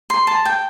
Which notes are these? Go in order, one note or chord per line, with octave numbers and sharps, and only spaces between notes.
C6
A5
G5